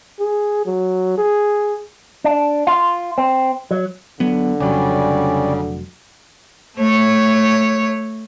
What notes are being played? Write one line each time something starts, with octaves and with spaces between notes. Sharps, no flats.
G#4
F#3
G#4
D4
F4
C4
F#3
D3 F#3 B3
F1 C#3 F#3 G3 C#4 D5
A3 C#5